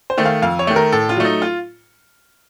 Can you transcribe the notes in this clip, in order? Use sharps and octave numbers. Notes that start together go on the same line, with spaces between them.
C5
D#3 A3
F5
F2 F5
C#5
D#3 A3
A#4
A2 A4
F4
F#3 A3
D#4
F4